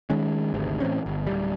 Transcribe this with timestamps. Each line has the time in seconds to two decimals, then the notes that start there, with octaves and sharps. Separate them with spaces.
0.10 D#3 G#3 C#4
0.54 G#1 D2 G#2 C3
0.80 A2 E3 C4 C#4
1.06 G1
1.27 D1 G3